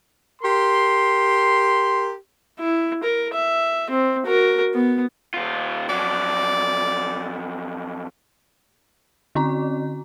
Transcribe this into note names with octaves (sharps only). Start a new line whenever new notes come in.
G4 A#4 C6
E4
A#4
E5
C4
F#4 A#4
B3
D#2 F4
F2 F#3 D5
D3 C4 C#4 F#4 A#5